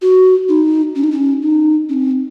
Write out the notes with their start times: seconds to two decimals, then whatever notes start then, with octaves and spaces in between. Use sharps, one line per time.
0.02 F#4
0.49 D#4
0.96 C#4
1.04 D#4
1.12 C#4
1.42 D#4
1.89 C#4
1.93 C4